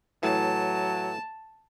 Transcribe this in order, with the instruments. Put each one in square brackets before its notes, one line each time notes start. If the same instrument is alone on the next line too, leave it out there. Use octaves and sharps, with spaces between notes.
[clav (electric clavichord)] A2 E3 [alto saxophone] F#3 [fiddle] A5